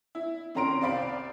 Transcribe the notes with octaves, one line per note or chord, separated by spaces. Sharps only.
E4
F2 D#3 C#4 A#5 C6 D7
C2 C5 D5 F5 B5 D7